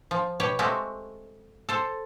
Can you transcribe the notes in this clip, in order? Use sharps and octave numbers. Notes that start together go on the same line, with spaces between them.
F3
B2 G4 C#5
G#3 A3 C4 F#4 G4
A4 C5